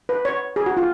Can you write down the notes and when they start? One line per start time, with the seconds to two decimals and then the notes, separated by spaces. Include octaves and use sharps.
0.09 B4
0.25 C#5
0.56 G#4
0.66 F#4
0.77 F4